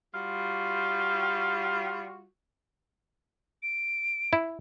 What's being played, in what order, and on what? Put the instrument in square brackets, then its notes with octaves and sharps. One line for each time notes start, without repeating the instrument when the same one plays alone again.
[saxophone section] G3 F4 F#4
[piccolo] D7
[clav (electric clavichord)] E4